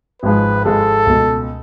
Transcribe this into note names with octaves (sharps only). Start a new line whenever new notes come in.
G#1 G#2 F3 G#3 B4
G#1 G#2 F3 G#3 A4
C#2 B2 A3